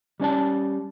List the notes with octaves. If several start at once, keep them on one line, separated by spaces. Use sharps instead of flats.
G3 C#4 D5 A5